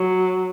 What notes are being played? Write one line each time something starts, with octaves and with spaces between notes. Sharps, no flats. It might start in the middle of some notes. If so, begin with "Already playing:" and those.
Already playing: F#3